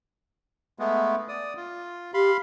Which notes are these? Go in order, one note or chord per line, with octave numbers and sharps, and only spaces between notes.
G#3 A3 B3
D5 D#6
F4
G4 F5 B5 C6